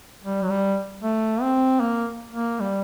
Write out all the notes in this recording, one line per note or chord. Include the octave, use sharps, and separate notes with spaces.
G3
F#3
G3
A3
C4
A#3
A#3
G3